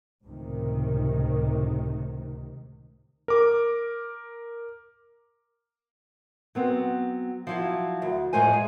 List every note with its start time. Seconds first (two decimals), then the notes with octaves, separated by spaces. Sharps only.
0.24 C#2 A2 C3 D#3
3.28 A#4 D6
6.55 F#3 B3 C4
7.47 F3 F#3 E4
8.02 D2
8.33 F2 A2 G#3 C5 G#5
8.53 G#4